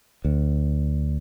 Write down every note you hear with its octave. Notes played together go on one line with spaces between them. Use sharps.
D2